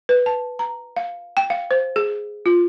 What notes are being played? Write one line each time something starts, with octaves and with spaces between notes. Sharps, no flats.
B4
A5
A#5
F5
G5
F5
C5
G#4
F4